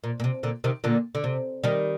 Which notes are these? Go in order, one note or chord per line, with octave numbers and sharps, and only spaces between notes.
A#2
A#2
C3
A#2 D3
C3 D#3
A#2 D3
D3
C3
D#3 G3